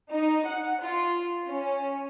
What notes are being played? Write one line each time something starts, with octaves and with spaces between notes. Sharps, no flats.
D#4
F#5
F4
C#4